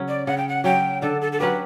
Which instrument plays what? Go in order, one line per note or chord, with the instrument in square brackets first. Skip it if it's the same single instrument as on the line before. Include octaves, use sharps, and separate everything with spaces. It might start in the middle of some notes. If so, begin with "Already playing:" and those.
Already playing: [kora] C#3 F#3 C#4
[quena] D5
[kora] C#3 [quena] F#5
[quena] G5
F#5
[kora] F#3 C#4 [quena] G5
[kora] D3 [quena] A4
[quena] A4
A4
[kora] F#3 C#4 G4 [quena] B4